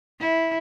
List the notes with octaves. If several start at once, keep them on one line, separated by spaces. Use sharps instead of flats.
E4